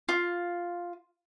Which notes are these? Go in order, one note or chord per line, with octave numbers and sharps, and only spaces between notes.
F4